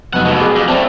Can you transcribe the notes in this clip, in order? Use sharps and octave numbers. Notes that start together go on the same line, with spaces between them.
F1 F#3 B3 D#5 F#5
F2 B2
G#4 D6
F2
E3 A3 C4 D5 A5